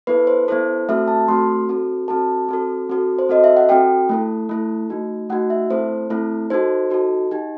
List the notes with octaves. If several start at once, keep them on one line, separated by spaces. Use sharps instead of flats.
B3 E4 A4 B4
C5
B3 E4 A4 C5
A3 C4 F#4 A4 E5
A5
A3 C4 F#4 A4 C6
C4 F#4 A4
C4 F#4 A4 A5
C4 F#4 A4
C4 F#4 A4
C5
C4 F#4 A4 D#5
E5
F#5
C4 F#4 A4 G5
A3 E4 A4
A3 E4 A4
A3 D#4 F#4
A3 D#4 F#4 F#5
E5
A3 C4 E4 A4 C5
A3 C4 E4 A4
D#4 F#4 A4 C5
D#4 F#4 A4
D#4 G4